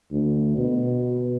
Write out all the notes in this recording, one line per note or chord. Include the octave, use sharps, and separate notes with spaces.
D2
B2